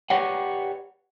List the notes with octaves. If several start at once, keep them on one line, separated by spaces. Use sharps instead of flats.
G4 B4 C#5 D5 F#5